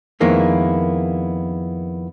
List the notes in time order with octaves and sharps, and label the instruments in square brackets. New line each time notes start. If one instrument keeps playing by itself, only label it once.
[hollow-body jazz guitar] F2 D#3 G#3 A#3 B3 E4